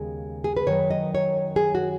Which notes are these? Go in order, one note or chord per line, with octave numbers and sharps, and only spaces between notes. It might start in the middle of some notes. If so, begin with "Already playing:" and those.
Already playing: D#2 C#3 G#3 B3
G#4
B4
F#2 D#3 F#3 C#5
D#5
C#5
G#4
F#4